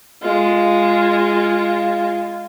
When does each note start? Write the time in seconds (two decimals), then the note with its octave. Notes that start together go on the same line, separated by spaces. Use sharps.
0.22 G#3 F4